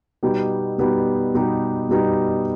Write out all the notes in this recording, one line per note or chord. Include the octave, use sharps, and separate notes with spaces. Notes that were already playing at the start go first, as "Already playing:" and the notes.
B2 G3 B3 D#4 G4
B2 G3 B3 D#4 G4
B2 G3 B3 D#4 G4
B2 G3 B3 D#4 G4